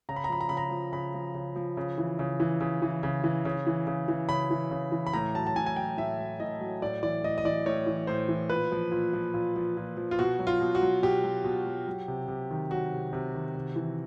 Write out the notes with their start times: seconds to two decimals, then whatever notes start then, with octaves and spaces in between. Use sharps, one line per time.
0.09 C#3 A#5
0.16 B5
0.24 A#5
0.29 F3 B5
0.41 A#5
0.49 C#3 B5
0.57 A#5
0.71 F3
0.92 C#3 B5
1.14 F3
1.34 C#3
1.56 F3
1.77 C#3
1.98 E3
2.19 C#3
2.40 E3
2.61 C#3
2.82 E3
3.03 C#3
3.24 E3
3.45 C#3
3.67 E3
3.87 C#3
4.08 E3
4.29 C#3 B5
4.51 E3
4.71 C#3
4.92 E3
5.07 B5
5.13 A2 A#5
5.35 F#3 A5
5.47 A5
5.56 A2 G#5
5.66 G#5
5.76 F#3 G5
5.98 A2 E5
6.19 F#3
6.40 A2 D#5
6.60 F#3
6.82 A2 D5
7.03 E3 D5
7.23 A2 D#5
7.38 D#5
7.45 E3 D5
7.66 A2 C#5
7.87 E3
8.07 A2 C5
8.29 E3
8.49 A#2 B4
8.72 F3
8.92 A#2
9.13 F3
9.34 A#2
9.56 F3
9.77 A#2
9.97 F3
10.11 F4
10.19 B2 F#4
10.39 F#3
10.47 F4
10.61 B2
10.75 F#4
10.82 F#3
11.02 B2 G4
11.24 F#3
11.44 B2
11.66 F#3
11.87 F#3
12.08 C3
12.28 C3
12.50 D#3
12.71 F#3 F#4
12.92 C3
13.13 C3
13.34 D#3
13.55 C3
13.76 E3